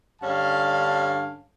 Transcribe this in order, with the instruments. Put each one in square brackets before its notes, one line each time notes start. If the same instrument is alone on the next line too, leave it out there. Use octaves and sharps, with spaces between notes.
[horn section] G2 D3 C#4 F5 A5